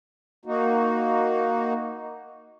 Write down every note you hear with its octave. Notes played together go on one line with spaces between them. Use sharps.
A#3 D#4 F#4